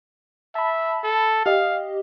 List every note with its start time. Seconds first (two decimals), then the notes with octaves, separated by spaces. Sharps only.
0.55 E5 A5 B5
1.04 A4
1.46 G4 D#5 F5